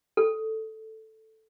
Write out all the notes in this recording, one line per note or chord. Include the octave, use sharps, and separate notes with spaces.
A4